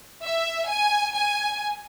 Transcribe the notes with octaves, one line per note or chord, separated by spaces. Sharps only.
E5
G#5
G#5